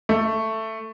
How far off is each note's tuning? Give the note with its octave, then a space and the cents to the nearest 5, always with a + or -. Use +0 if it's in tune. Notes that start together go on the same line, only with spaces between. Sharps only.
A3 +10